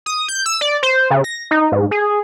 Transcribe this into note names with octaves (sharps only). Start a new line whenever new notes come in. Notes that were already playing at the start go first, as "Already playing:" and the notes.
D#6
G6
E6
D5
C5
C#3
A#6
D#4
G#2
G#4